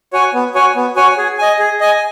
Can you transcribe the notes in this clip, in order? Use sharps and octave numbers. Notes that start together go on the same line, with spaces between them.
F#4 C#5 G#5
B3
F#4 C#5 G#5
B3
F#4 C#5 G#5
G#4
D#5 G#5
G#4
D#5 G#5